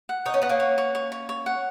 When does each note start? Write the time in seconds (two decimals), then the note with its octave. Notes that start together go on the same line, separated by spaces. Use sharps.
0.09 F#5
0.25 D#4 C#6
0.34 C#4
0.42 B3 F#5
0.49 A#3 C#4
0.60 C#5
0.78 C#5
0.95 C#5
1.12 C#5
1.29 C#5
1.46 F#5